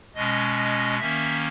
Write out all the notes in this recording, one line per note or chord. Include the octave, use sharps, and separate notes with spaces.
B2 G#3 C#4 D#5
D#5
D#3 A#3 C#4 E5